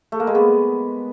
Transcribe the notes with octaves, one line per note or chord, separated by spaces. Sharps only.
A3
A#3
G#3
B3